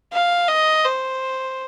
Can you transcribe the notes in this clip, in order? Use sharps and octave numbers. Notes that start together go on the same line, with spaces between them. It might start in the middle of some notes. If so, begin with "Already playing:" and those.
F5
D#5
C5